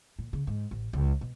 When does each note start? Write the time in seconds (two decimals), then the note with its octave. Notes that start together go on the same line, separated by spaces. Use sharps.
0.19 A#2
0.33 C#3
0.47 G#2
0.71 A1
0.93 C#2
1.21 B2